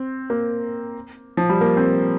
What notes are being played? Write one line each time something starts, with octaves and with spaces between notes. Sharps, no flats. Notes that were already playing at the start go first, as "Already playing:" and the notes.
Already playing: C4
A#3
F3
G3
A#3
C4